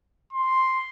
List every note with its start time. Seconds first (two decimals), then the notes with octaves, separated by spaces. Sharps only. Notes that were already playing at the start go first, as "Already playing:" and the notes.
0.33 C6